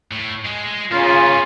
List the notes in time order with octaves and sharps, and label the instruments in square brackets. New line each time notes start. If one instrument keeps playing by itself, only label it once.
[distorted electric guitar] A2
G#3
[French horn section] C#3 [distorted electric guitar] A#3 B3 [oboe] F4